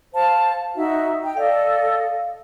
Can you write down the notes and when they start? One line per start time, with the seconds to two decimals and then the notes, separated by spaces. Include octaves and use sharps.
0.13 C5 F5 A5
0.75 D#4 F#4 E5
1.23 G5
1.37 A4 D5 D#5 F5